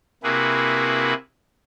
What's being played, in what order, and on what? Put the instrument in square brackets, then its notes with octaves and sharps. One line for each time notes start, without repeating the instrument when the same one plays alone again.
[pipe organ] C3 A#3 E4 F#4 G#4 B4